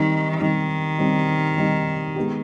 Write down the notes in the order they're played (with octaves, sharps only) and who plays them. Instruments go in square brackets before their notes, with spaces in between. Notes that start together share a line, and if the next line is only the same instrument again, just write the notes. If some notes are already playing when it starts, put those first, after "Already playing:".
Already playing: [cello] D#3 [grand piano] G3 C4 D#4
[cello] D#3 [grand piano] G3 C4 D#4
[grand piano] G3 C4 D#4
G3 C4 D#4
G#3 B3 D#4 G4